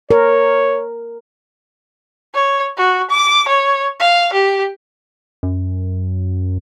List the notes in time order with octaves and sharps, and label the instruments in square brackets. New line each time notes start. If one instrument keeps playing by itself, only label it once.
[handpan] A#4 [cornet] C#5
[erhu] C#5
F#4
D6
C#5
F5
G4
[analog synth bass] F#2